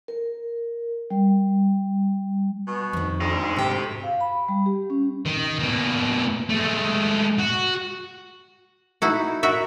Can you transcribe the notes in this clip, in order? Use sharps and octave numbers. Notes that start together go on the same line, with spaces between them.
A#4
G3
B2
F2 D#3
D2 D#4 C5
G#2 C3 G4 G5
F5
B5
G3
G4
C#4
D#3
B2 A#3
G#3 A3
F#4
D#4 E4 F#4
F#4 A#4 E5